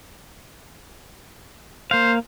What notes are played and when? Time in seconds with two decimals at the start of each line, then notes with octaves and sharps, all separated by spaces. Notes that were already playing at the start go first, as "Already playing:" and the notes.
1.91 A#3 C5 F5